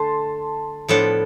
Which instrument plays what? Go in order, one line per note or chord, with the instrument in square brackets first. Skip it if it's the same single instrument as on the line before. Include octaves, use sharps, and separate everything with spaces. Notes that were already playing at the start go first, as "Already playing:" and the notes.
Already playing: [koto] D3 A3 [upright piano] A5 C6
[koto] A2 F3 B3 D4 A4